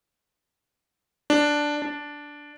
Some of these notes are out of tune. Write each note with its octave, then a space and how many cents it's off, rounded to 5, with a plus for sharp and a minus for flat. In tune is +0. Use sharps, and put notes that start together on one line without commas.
D4 +0
D4 -5